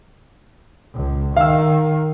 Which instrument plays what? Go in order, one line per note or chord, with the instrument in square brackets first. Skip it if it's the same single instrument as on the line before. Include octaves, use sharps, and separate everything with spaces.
[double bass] C#2
[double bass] D#3 [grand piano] F5 E6